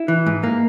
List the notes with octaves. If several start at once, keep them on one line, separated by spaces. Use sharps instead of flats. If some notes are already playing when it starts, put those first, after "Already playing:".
Already playing: E4
E3
G#2
A#3